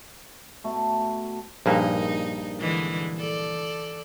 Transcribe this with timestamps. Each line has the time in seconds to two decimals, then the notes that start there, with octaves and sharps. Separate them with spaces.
0.64 B2 A3
1.66 A#1 G2 A#3 D#4
2.59 D3 E3 G#3
3.18 A4 D5